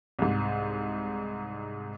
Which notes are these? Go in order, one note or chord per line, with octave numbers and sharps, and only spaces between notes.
C2 G#2